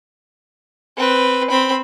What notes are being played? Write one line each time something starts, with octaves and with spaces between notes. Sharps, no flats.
C4 B4
C4 B5